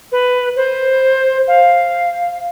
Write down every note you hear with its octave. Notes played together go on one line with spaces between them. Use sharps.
B4
C5
F5